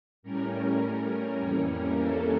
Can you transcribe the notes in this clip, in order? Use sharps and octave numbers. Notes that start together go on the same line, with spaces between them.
A2 G3 C#4 A#4
F2 E3 G3 A#3 C#4 C#5
A#4
A4